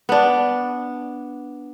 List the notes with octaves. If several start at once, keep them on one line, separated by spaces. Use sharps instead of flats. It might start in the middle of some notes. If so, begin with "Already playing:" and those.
B3 D4